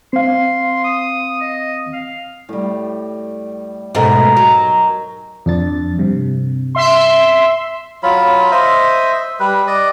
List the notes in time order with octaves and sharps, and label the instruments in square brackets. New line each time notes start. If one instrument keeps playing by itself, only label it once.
[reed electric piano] C4 F5 [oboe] C6
[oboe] D#6
D#5
F5
[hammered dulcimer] A2 G3
[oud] G#2 B2 A3 [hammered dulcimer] D#4 A#4 G#5
[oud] F#3
[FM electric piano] F2 D4 A6
G2 C3
[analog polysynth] E5 C6
[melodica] F#3 F4 B5
C5 D#5 E5
G3 B4
D5 D#5